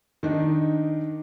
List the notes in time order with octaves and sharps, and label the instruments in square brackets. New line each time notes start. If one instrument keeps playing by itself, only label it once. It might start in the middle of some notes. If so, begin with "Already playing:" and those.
[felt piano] D#3 D4 D#4